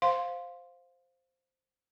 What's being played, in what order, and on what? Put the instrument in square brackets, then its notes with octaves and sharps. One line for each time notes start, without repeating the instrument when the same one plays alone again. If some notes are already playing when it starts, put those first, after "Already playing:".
[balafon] C5 F5 C6